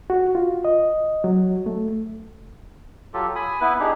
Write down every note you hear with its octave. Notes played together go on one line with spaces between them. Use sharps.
F#4
F4
D#5
F#3
A3
F#3 F4 G4 A4
G#5 B5 D#6
B3 E4 B4
D4 D#4 G4 G#4